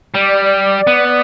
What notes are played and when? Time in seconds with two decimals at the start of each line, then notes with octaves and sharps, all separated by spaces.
0.14 G3 D5
0.87 B3